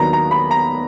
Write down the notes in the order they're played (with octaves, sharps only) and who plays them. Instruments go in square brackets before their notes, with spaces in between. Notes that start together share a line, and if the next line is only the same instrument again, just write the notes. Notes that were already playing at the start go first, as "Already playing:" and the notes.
Already playing: [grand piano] D#2 D#3 F#3 B3 D4 A#5
A#5
B5
A#5